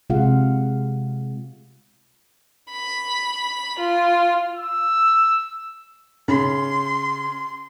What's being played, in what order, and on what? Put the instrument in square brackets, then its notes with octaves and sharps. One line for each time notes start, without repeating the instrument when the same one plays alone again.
[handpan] C3 G#3 F4 G#4 F5 F#5
[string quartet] B5
F4
[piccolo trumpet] E6
[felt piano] C#3 [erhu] C6